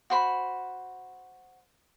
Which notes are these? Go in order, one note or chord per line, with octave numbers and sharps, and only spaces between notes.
F#4 C5 B5